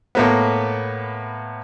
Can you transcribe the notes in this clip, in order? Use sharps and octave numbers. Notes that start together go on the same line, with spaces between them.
A2 A#3 B3